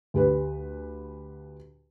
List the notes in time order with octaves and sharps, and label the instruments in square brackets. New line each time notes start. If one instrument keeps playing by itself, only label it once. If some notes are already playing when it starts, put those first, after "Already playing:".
[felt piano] D2 G4 B4